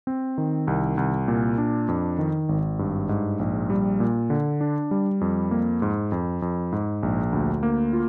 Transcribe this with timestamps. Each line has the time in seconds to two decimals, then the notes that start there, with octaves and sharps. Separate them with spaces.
0.07 C4
0.38 D#3
0.67 C2
0.97 C2
1.28 A#2
1.58 D4
1.88 F2
2.19 D#3
2.49 G#1
2.79 G2
3.09 G#2
3.39 A#1
3.70 G3
4.00 A#2
4.30 D3
4.61 D4
4.91 G3
5.21 F2
5.51 A#3
5.82 G#2
6.12 F2
6.42 F2
6.72 G#2
7.03 A#1
7.33 D2
7.63 A#3
7.93 F4